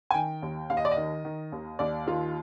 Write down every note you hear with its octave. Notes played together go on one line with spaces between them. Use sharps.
G#5
D#3 G5
D#2
D#2 F5
D#5
D5
D#5
D#3
D#3
D#2
D#2 D5
D#3 F4